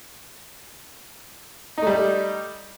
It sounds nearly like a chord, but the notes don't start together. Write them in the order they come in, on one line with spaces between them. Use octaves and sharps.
D#4 A3 G3